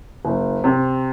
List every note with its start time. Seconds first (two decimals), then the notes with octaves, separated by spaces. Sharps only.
0.25 F#1
0.64 C3